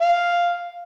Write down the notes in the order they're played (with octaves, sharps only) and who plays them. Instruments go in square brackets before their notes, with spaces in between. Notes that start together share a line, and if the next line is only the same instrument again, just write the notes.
[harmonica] F5